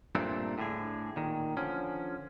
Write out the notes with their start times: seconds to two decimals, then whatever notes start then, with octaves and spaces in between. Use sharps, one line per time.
0.15 G2 A#2 A3 C4 D4
0.58 A2 D3 G#4
1.16 A#2 D#3
1.57 D3 F3 C#4